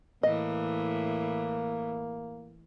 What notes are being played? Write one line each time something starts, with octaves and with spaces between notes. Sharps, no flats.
A2 E3 A#3 D#5